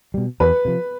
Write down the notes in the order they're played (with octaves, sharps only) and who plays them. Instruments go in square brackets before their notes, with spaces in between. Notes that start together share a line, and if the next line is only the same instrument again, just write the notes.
[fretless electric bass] B2 G3
[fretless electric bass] E2 [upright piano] B4
[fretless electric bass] C3 F3